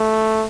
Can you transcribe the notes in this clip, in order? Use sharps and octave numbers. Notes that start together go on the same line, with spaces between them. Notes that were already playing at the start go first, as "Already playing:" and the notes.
Already playing: A3